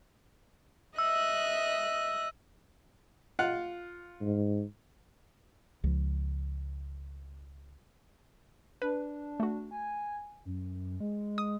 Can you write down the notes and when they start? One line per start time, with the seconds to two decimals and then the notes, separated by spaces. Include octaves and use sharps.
0.98 D#5 E5 E6 F#6
3.39 F4 F5 F#5
4.21 G#2
5.84 C#2 F3
8.82 D4 B4
9.40 A3 F#4
9.71 G#5
10.45 F#2
11.00 G#3
11.38 D#6